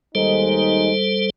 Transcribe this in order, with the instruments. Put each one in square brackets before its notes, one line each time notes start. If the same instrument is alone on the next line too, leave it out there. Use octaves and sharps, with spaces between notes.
[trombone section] D#2 G#3 D#4 [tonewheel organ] G3 A4 C5